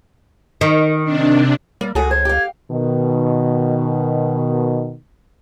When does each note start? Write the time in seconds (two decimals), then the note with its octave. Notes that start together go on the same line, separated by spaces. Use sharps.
0.61 D#3
1.04 C3 D4
1.81 G3 A#3
1.95 C#2 F#4 G#4 A4
2.11 C5 G#6
2.25 G4 F5
2.71 B2 D#3